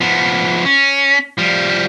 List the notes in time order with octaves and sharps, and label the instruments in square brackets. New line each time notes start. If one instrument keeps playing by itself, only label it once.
[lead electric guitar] F3 B3
C#4
F3 G3